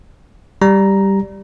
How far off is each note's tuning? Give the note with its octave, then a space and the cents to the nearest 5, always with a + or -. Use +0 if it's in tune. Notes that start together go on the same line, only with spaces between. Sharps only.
G3 +0 A#5 +5